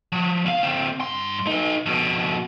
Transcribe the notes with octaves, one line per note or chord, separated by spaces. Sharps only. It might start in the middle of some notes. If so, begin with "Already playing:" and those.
F3
B1 F5
D3 C4
G2 C6
D#4 B4
F2 B2